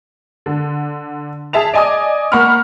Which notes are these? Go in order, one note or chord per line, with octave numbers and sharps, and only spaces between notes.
D3
G#4 E5 A5 F7
D5 D#5 G#5 D6 D#6
A#3 F#5 B5 C#6 F6